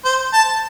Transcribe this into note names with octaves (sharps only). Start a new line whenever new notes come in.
C5
A5